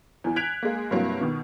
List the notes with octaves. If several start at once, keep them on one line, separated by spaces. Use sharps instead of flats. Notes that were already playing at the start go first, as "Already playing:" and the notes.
E2 E3
F#6 G#6 B6 D7 F7
G#3 A#3
G2 C3 F#3 A#3 E4
B2 D#3